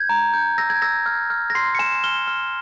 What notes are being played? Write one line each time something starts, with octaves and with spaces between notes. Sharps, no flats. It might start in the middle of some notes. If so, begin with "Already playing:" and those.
Already playing: G6 G#6
A#5
G6
E6 A#6
G#6
E6 A#6
F6
F6
A#6
C6 C7
C#7
G#5 E7
F6 G7
F6